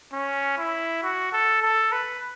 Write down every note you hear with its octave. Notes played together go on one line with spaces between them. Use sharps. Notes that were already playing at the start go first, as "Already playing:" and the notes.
C#4
E4
F#4
A4
A4
B4